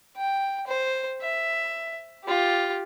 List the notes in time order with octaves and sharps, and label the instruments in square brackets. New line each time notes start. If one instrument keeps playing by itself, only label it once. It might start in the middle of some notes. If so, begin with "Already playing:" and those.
[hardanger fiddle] G5
C5
E5
F4 G4